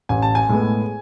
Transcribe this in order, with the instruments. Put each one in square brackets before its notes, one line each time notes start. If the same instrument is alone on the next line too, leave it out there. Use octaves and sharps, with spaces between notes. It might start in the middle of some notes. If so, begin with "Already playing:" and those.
[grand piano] A1 [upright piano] G#5
[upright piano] A5
G#5
[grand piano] A2 G#3 B3